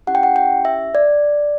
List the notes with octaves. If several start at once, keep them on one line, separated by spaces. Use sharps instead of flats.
C#4 E4 G4 F#5
G5
F#5
G5
E5
D5